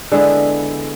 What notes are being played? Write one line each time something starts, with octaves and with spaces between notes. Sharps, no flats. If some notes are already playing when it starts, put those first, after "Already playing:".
D3 G#3 B3 E4